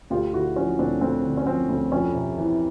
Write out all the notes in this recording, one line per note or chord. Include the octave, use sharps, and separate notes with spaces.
D2 F4 G4
D3 E4 F#4
F3 C#4
D2 C4 D4
D2 C4
D3
C#4
F3 C4
D2
F2 C#4
C3
E3